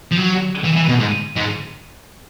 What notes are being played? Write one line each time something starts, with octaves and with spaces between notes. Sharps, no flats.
F3
F#3
E3
E3
B2
G#2
G#2